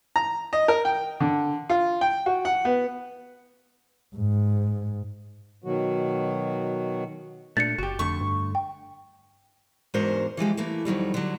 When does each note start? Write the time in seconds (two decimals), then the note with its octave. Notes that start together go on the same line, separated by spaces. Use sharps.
0.16 A#5
0.53 D#5
0.68 A#4
0.85 G5
1.20 D3
1.69 F4
2.01 G5
2.26 F#4
2.45 F#5
2.65 B3
4.15 G#2
5.64 B2 D#3 F#3 F#4
7.57 A#2 A3 D4 A6 C#7
7.78 F#1 F#4 G4
7.99 F2 D3 A3 C#6
8.21 G2
8.55 G5
9.94 E2 G#2 D4 F#4 A#4 C5
10.37 E3 F3 G#3 G4
10.57 E3 A3 A#3
10.85 F2 D#3 F#3 G3
11.14 D3 F#3